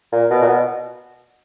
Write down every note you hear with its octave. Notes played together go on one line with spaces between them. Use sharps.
A#2
B2
A#2
B2